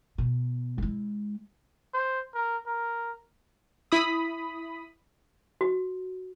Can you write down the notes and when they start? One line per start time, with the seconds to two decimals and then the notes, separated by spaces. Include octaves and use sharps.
0.18 B2
0.78 G#3 E4
1.94 C5
2.35 A#4
2.67 A#4
3.92 E4 B5 D#6
5.61 F#4